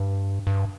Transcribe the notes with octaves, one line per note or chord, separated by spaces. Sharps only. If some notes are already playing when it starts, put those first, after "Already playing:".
Already playing: G2
G2